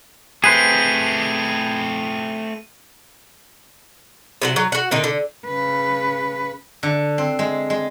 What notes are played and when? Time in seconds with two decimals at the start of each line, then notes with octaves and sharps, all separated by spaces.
0.44 A3 C4 G#4 B4 C5 D#7
4.42 C3 F#3 F#5
4.56 F#3
4.72 F#4 F#5
4.91 A#2 D3 D#4
5.04 D3
5.46 C#3 B4
6.83 D3
7.18 C4
7.39 G#3
7.70 G#3